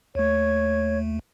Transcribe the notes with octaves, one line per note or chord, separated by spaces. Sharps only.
D#2 A3 C#5